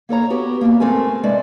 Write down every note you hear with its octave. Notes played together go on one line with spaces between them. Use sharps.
A#3 A4 C#5 A#5
B3 F#4 G4
A#3 D4 G4
G#2 A3 C4 A4 A#4 G#5
G#3 A3 D4 B4 D5